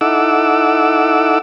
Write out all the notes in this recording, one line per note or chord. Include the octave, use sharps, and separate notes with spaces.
D#4 E4 A4 F#5 D6 E6